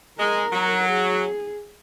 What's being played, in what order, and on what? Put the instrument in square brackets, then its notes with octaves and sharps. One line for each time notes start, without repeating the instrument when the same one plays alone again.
[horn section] G#3 [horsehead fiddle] A#4
[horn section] F#3
[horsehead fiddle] G#4